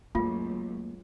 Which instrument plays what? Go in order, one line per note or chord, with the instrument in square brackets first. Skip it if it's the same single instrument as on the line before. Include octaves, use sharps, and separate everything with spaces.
[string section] C#2 F#2 [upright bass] A3 [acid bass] A#3 [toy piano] F4